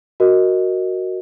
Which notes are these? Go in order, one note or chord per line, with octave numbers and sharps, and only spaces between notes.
F#4 A#4 D#5